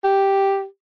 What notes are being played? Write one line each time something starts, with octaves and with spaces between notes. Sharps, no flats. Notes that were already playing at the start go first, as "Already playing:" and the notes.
G4